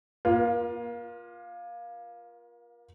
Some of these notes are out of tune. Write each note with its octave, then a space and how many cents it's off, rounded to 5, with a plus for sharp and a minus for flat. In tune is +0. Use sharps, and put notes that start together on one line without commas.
A#3 +35 F4 +10